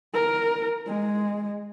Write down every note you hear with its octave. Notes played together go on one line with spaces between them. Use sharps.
A#4
G#3